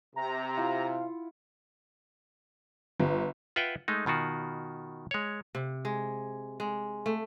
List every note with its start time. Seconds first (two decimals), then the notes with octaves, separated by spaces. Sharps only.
0.16 C3 A#5
0.57 E4 F4 F5 F#5
3.00 G1
3.56 F4 B4 E5 F#5 G5
3.88 G#3 A3 D#4
4.06 B2 D#3 F4 F#4
5.11 G#3 C#5
5.55 C3
5.85 G#3
6.60 G#3
7.06 A3